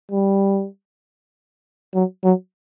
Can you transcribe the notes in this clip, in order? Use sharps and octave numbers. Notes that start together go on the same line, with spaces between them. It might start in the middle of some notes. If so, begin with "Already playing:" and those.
G3
F#3
F#3